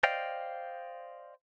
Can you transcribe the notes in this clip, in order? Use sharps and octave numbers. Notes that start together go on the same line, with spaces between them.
C5 D5 D#5 F5 G5